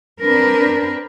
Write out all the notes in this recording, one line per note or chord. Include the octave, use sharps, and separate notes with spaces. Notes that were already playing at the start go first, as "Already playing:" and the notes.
C4 D4 A#4 B4